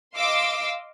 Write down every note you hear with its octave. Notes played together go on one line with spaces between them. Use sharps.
D#5 F5 C6 D6 E6